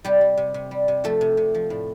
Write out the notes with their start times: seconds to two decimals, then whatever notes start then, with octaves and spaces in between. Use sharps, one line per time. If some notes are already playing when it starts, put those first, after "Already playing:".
0.04 C3 G3 G4
0.21 G3
0.38 C3
0.54 C3
0.71 G3
0.88 C3
1.04 F3 A3 A4
1.21 C3
1.37 C3
1.55 F3
1.70 A2